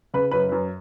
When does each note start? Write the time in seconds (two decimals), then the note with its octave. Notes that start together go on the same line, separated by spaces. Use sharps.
0.14 C#3 B4
0.31 F#2 B4
0.49 F#2 B4